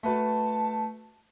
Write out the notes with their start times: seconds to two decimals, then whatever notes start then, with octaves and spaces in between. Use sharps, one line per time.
0.03 A3 F#4 B4 A5